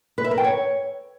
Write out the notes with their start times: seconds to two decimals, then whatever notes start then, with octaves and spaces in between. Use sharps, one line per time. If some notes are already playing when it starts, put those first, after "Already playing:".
0.18 B4
0.24 E5
0.31 A#4
0.38 G5
0.44 C#5